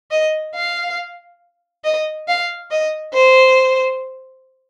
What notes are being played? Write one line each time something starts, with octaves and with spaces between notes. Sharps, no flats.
D#5
F5
D#5
F5
D#5
C5